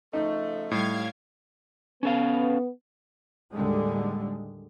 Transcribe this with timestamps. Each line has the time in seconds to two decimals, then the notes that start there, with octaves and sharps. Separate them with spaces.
0.13 C#3 F3 A3 D#4
0.71 A2 G3 F5 G#6
2.03 B3 C#4 A4 F5
3.53 D#2 A2 D3 G3 G#3